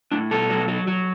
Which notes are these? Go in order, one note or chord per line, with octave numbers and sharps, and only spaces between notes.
A2 D4
B2 A4
F#3
F#3
F#3